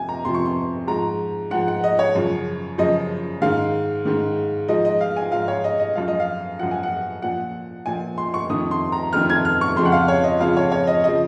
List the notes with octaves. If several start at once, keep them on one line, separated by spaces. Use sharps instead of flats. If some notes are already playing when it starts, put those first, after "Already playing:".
Already playing: F2 C3 F3 G#5
A#5
F2 C3 F3 C6
C#6
C6
G#2 F3 A#5
G#2 F3 F#5
F#5
D#5
C#5
F#2 C#3 F3
F#2 C#3 F3 D#5
G#2 D#3 F5
G#2 D#3
G#2 F3 D#5
D#5
F5
G#5
G#2 F3 F5
C#5
D#5
D#5
F#2 F3 F5
D#5
F5
F#2 F3 F#5
G#5
F#5
A#2 F3 F#5
A#2 F3 G#5
C6
C#6
F2 D#3 D#6
C6
A#5
F2 D#3 F6
G#6
F6
C#6
F2 C#3 F3 C6
F#5
F5
C#5
D#5
F2 C#3 F3 F5
C#5
C#5
D#5
C#3 F3 D#5